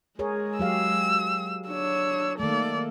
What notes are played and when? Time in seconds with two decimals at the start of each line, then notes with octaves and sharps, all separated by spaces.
0.19 G#3 G#4 A#4 C#5
0.59 F#3 G4 F5 E6
1.68 D4 C#5 E6
2.40 D#3 A3 A#3 A4 D5